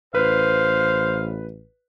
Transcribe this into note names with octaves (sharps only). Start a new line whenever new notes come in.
A1 B4 C5 F5